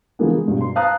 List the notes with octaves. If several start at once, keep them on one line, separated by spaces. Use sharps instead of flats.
D3 E3 F3 G#3 A#3 B3
G#3
G2 B2
C6
F5 A5 A#5 D#6 F6 F#6